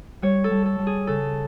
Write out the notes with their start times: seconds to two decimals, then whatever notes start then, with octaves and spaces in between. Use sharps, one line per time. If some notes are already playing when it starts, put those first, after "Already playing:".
0.22 G3 C#5
0.44 A4
0.51 G3
0.66 A4
0.79 G3
0.87 G#4
1.07 C#3 A4